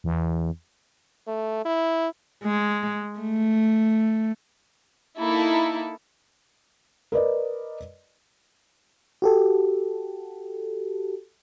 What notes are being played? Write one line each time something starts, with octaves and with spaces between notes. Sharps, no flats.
E2
A3
E4
G#3
A3
A#3 D#4 E4 A4
A#4 B4 D5 D#5
F#4 G4 A4